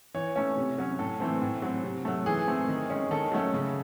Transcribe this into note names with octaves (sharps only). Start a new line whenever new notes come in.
E3 C#5
A3 C#4
C3
F#3 C#4
A2 A4
E3 A3 C4
A2
F#3 C4
C3
F#3 A3
E3 G#4
A3 C4
D#3
G#3 C#4
D#3 A4
F#3 A3 C#4
C#3